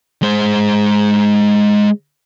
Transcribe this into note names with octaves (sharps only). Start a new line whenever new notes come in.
G#3 C5